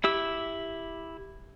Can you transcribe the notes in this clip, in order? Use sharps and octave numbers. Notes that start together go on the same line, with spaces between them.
E4 G4 E6